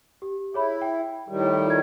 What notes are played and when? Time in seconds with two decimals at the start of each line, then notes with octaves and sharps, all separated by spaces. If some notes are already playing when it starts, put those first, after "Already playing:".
0.22 G4
0.54 E4 G#4 C#5 B5
0.81 G5
1.28 A2 D#3 G3
1.66 F4 G#6